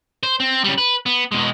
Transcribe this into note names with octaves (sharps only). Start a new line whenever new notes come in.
C5
C4
C#3 G3
B4
B3
B2 G#3